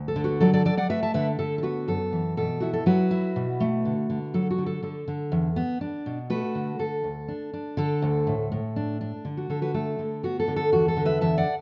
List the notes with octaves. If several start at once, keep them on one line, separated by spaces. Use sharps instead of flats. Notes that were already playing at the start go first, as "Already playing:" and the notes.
Already playing: D2
A4
D3
F#4 B4
F#3 A4 D5
A4 D5
F#3 A4 D5
D5 F#5
A3 B4 E5
E5 A5
D3 B4 E5
D3 A4
A4
B3 F#4 B4
F#2 A4
E3
B2 A4
E4 F#4
A4
F#3 F#4 B4
E4
B2
A3
D3
D3
F#3 A4
F#4
D3
A4
D3 A4
D3
E2
B3
D4
B2
A3 F#4 B4
D3
D3 A4
D2
D4
D4
D3 A4
D2
A2
A2
D4
D4
D3
F#4
D3 A4
F#4 B4
A3 A4
D3
B3 F#4
A4
D3
A4
E2 F#4
A4
D3
B4 E5
E2 E5 A5
D5 F#5